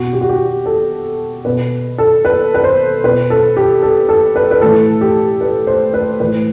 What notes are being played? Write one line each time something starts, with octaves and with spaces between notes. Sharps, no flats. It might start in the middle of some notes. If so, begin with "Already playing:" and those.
Already playing: B2 F#4
G4
F#4
G4
A4
B2 B4
A4
B4
B4
C5
B2 B4
A4
G4
A4
A4
B4
B4
A2 E3 A4
G4
B4
C5
B4
A2 E3 B4